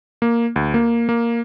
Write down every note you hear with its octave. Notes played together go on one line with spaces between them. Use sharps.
A#3
D2
A#3
A#3